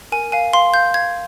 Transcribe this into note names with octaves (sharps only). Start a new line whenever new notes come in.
A#4 G#5
F5 G#5
F5 C6
F5 G6
F5 G#6